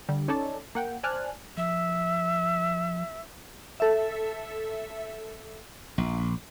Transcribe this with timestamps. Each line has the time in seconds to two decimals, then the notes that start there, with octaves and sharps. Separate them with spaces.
0.09 D3 G3
0.28 C#4 D#4 A4 C#5 D5 A5
0.75 A#3 F#5 G5
1.03 C5 D5 G#5 A5 F6 F#6
1.57 F3 E5
3.80 A4 E5
5.98 A#1